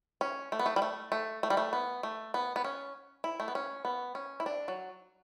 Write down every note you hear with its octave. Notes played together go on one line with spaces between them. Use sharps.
C#4
A3
B3
A3
G3
A3
A3
A3
G3
A3
B3
A3
B3
B3
C#4
E4
A3
B3
C#4
B3
C#4
E4
D4
F#3